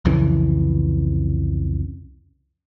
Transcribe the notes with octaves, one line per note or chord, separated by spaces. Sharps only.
C2 F2 C#3 E3